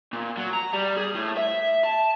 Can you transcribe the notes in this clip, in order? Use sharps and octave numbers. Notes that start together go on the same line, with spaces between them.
A#2
F#3
A#5
G3
G#4
A2
E5
A5